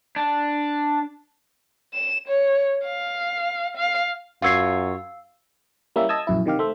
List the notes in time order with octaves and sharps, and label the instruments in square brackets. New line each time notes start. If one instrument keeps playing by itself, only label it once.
[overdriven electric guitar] D4
[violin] E7
C#5
F5
F5
[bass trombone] F#2 [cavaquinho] F4 F#4 C#5 [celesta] F5 E6 C7
[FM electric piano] G3 A#3 C#4 E4 E5
D#5 A5 D#6 E6 G#6
A#1 F#2 E4
C3 D#3 G4 F5
A3 C5 E5